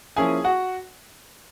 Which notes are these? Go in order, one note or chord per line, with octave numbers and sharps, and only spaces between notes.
F3 A#3 C#4 E4 G#4 G#5
F#4 F#5